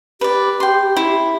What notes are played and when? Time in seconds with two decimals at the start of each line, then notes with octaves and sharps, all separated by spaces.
0.21 G4 B4 D5
0.60 G5 C6
0.96 E4